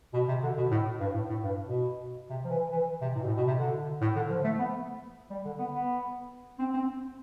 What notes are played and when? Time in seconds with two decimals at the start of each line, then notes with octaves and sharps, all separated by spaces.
0.14 B2
0.28 C3
0.43 D3
0.57 B2
0.71 A2
1.00 G2
1.14 A2
1.29 A2
1.43 G2
1.65 B2
2.29 C3
2.44 F3
2.50 E3
2.72 E3
3.01 C3
3.15 A2
3.20 B2
3.26 A2
3.37 B2
3.47 C3
3.58 D3
4.01 A2
4.15 D3
4.30 F3
4.44 A3
4.59 B3
5.30 G3
5.45 D3
5.59 B3
5.73 B3
6.59 C4
6.74 C4